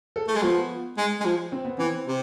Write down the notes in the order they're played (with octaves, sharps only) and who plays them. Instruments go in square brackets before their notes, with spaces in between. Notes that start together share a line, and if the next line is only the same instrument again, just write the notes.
[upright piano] A4
[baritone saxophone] A3
G#3
[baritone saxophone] F3 [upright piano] B3
[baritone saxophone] G#3
G#3
F3
[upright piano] C4
B3
[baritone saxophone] E3 [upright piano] C4
[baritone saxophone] C3